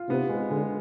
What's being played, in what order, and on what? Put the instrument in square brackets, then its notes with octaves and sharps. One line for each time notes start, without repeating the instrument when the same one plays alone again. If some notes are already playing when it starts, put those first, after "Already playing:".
Already playing: [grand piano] F4
[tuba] C3 [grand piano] B3
[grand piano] G#3
[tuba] D3 [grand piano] G#3